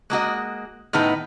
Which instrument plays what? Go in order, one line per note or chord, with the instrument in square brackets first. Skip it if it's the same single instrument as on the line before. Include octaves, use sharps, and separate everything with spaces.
[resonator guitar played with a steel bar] G#3 A#3 F#4 D#5
A2 D#3 B3 D#4 B4